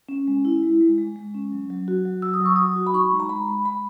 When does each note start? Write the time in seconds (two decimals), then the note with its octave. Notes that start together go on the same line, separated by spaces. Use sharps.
0.09 C#4
0.27 G#3
0.45 E4
0.63 G#3
0.81 G#3
0.98 G#3
1.16 G#3
1.34 C#4
1.52 F#3
1.70 F#3
1.88 F#4
2.05 F#3
2.22 F#3 E6
2.34 D#6
2.41 F#3 C#6
2.56 F#4 D#6
2.76 F#4
2.87 B5
2.94 D#4 C#6
3.12 G#3
3.20 A#5
3.29 G#3 B5
3.48 G#3
3.65 G#3 B5